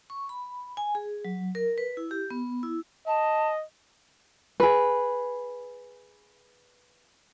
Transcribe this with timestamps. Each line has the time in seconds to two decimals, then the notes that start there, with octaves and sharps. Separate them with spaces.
0.10 C#6
0.29 B5
0.77 G#5
0.95 G#4
1.25 F#3
1.55 A#4
1.78 B4
1.97 E4
2.11 G4
2.30 B3
2.63 E4
3.07 D#5 A5
4.60 G#4 B4